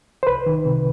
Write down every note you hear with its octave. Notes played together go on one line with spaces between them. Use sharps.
C5
C2 B4
D#3
C3